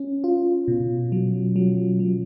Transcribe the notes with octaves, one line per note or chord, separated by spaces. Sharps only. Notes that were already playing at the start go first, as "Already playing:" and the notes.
Already playing: C#4
F4
B2
F#3
F#3
F#3